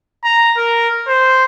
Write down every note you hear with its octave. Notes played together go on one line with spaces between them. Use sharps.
A#5
A#4
C5